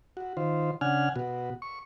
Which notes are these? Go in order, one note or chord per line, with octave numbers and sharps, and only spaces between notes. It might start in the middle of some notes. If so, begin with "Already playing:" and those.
F#4
D#3 F4 C5
C#3 D4 F#5 G#5 F6
B2 F#4
C#6